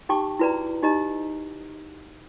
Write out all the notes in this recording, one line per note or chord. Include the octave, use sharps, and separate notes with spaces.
D#4 G4 G5 A5 C#6 D6
E4 F#4 B4 D5 A#5
D#4 G4 D#5 A#5